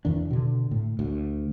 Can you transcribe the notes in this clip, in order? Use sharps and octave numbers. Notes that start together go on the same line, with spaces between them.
E2 D#3 D4
B2 D3
A2
D2